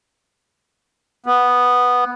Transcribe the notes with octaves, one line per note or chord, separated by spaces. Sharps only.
B3